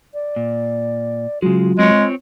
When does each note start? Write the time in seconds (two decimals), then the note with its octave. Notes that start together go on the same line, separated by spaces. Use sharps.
0.14 D5
0.36 A#2
1.42 C#3 F#3 G#3 F4
1.79 G#3 C4 C#5